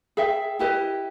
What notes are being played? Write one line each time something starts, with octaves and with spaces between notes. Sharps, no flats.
G#4 E5 G5
E4 G4 B4 D#5